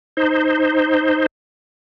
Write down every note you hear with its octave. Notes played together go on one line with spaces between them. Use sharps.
D#4 C5